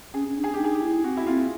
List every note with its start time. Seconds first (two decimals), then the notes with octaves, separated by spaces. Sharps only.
0.14 C#4 G#4
0.28 C#4
0.37 D4
0.44 G#4
0.54 G4
0.59 D#4 G#4
0.75 G4
0.82 E4
1.04 C4 F#4
1.17 E4
1.27 C4 F4